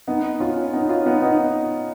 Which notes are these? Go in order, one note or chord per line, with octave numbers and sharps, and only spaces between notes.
B3 D#4
C#4 F4
C#4
B3 D#4
C#4 F4
B3 D#4
B3 D#4